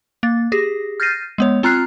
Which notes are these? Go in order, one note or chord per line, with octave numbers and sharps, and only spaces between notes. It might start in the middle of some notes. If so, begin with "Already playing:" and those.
A#3 A6
G4 G#4 A#6
F6 G6 A6 A#6 C7 D#7
G#3 B3 C#5
C4 F4 A#5 F6 F#6 C7